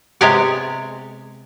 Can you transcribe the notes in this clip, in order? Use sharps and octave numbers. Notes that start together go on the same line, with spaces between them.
C3 G#3 B3 G4 C#5 D5